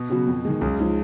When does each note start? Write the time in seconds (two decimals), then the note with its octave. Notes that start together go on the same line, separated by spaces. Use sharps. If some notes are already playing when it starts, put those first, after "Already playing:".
Already playing: B2
0.09 C#3 F#3 B3 F#4
0.27 F2
0.45 D#3 G#3
0.61 C#2 F#2 C#3
0.79 F3 G#3 D#4